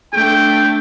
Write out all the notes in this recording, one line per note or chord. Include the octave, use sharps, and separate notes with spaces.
A3 D4 G5